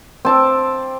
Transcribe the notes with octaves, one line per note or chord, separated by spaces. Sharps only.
C4 A5 D6